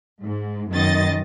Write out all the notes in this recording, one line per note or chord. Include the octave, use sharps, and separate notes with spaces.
G#2
F#2 B2 D#3 D#5 A6